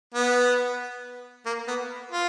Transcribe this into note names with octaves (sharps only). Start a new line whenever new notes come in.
B3
A#3
B3
F4